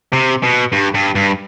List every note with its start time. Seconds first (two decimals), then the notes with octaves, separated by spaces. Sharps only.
0.13 C3
0.43 B2
0.72 G2
0.94 G2
1.15 G2